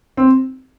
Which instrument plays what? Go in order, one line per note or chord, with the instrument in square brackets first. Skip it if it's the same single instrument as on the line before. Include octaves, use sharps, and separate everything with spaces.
[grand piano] C4